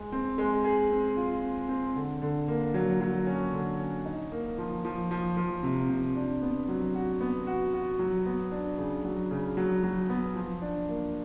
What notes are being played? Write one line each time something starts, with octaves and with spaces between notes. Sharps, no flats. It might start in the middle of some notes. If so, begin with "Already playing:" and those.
Already playing: G#3
C4
G#3
G#4
C4
F4
C4
C4
D3
D3
A#3
F#3
F#3
C#4
D3
C#4
D#4
A#3
F3
F3
F3
F3
C3
C3
D4
B3
F#3
F#4
B3
F#4
F#4
F#3
B3
D4
C#3
F#3
C#3
F#3
F#3
B3
F3
D4
A#3